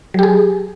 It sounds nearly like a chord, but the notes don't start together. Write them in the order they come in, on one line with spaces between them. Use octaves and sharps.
F#3 G4 G#4